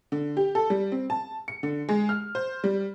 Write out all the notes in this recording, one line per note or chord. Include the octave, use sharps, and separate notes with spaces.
D3
G4
A4
G3
C4
A5
C#7
D3
G#3
F6
C5
G3